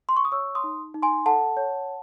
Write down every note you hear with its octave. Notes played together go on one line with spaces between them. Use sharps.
C6
C#6
D#6
C#5 C#6 E6
C6 D#6
D#4
D#4
G#5 C6
A4 F#5 A5
C#5